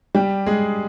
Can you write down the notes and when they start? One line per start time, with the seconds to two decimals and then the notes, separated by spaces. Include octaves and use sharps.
0.15 G3 G4
0.46 G#3 G#4